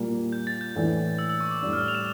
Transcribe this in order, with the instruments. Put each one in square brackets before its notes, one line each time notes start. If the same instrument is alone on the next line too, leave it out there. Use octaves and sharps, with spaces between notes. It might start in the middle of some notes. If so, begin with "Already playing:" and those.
Already playing: [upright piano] A#2 G3 A#3
[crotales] G6
A6
G6
[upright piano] A2 E3 A3 D4 [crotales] G6
[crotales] E6
E6
C#6
D6
[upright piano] A2 G3 D4 [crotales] E6
[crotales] F6
F7
E7